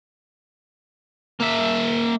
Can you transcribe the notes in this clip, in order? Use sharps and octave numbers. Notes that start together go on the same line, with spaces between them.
A#3 E5